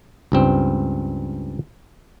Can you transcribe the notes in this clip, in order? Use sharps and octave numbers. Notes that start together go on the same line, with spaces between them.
C#2 G2 C4